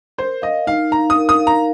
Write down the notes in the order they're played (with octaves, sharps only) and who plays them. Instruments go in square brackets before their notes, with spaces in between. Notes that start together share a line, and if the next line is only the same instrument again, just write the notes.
[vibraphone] A#4 [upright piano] C5
[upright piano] D#5 [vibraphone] F5
[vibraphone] D#4 [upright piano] F5
[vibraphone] D#4 [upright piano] A#5
[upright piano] D#6
[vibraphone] A#4
[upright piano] D#6
[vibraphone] F5
[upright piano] A#5